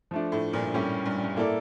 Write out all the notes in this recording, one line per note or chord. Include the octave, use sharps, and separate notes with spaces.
F3 A3 D4
A2
G2 A#2
A2 G3 C#4 G4
G2
G2
A2 A#3 E4 A4 D5